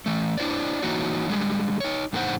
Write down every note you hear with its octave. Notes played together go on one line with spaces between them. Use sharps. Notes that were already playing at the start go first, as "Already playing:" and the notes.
E3 A3
D4 E4 C5 D5
E3 A#3 D#4 E4 F#4 C#5
D3 G3 G#3
D#4 C#5
F2 A#2 D3 D#4 C5 F#5